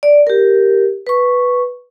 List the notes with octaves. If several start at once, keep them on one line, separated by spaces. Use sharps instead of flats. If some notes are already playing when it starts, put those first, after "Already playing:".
D5
G4 A#4
B4 C#6